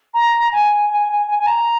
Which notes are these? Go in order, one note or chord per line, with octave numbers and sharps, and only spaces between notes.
A#5
G#5
G#5
G#5
G#5
G#5
A#5